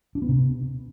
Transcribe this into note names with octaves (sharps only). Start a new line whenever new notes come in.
D4
B3
C3